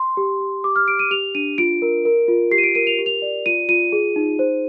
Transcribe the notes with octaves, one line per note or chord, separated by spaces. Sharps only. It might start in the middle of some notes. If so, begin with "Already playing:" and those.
Already playing: C6
G4
G4
G4 D6
F6
G4 D7
D#7
G4 F7
D4 D#7
F4 D7
A#4
A#4
F4
G4 C7
D#7
D7
A#4 D#7
F7
G4
F7
D5
F4 D#7
F4 D#7
G#4
D#4
C5